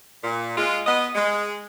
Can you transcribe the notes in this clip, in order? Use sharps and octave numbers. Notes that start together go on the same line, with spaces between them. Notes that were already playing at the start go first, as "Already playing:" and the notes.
A#2
G#3 F4
B3 D#5
G#3